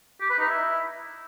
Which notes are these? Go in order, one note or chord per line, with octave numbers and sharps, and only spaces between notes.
G4
B4
D#4
E4